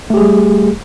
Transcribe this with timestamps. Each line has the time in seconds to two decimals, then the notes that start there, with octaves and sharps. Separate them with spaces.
0.10 A3
0.14 G4
0.17 G#4
0.21 G3